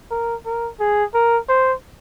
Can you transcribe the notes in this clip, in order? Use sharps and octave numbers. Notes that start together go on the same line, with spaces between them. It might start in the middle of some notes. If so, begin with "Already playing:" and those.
A#4
A#4
G#4
A#4
C5